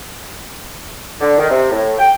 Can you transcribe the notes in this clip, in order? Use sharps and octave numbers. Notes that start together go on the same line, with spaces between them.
D3
D#3
C3
A2
G5